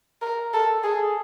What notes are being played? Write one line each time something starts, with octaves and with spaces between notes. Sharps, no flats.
A#4
A4
G#4